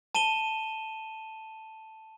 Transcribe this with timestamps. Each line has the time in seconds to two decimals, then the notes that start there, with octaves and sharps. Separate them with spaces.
0.15 A5 D#7 E7 G7